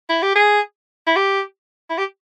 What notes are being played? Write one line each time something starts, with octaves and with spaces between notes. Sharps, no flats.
E4
G4
G#4
E4
G4
E4
G4